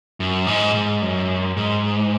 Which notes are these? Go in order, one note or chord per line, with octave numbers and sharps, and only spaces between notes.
F#2
G#2
G#2
F#2
G#2